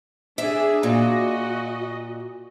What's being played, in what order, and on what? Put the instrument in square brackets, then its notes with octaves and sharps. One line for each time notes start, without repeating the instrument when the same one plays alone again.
[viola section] D4 G#4 [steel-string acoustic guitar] E5
[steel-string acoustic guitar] A#2 [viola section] F#4 D#5